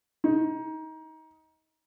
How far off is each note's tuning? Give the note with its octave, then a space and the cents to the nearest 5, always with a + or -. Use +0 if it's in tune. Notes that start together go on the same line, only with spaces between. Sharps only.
D#4 +25